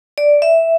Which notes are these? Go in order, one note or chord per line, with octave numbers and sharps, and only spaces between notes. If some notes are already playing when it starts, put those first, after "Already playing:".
D5
E5